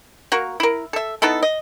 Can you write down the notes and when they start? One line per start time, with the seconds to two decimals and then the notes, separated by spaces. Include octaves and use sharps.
0.32 A#3 F#4 A#4
0.60 E4 A#4
0.93 A4 E5
1.22 B3 D#4 E4 A4
1.43 D#5